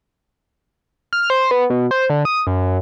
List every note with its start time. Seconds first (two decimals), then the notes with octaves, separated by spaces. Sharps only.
1.13 F6
1.30 C5
1.51 B3
1.70 B2
1.91 C5
2.10 D3
2.25 D#6
2.47 F#2